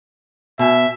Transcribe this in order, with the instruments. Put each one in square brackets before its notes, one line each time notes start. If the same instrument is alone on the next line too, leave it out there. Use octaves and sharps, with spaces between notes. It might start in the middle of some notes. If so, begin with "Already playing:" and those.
[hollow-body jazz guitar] B2 G#5 [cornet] E5